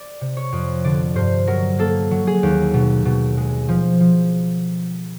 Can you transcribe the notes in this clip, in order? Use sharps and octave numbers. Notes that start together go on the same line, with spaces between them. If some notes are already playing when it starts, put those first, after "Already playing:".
Already playing: D5
C3
C#5
F2
D3 D5
G2 C5
F#3 A#4
A#3 A4
F#3
G#4
D#2
B2
B2
G#3
F3
F3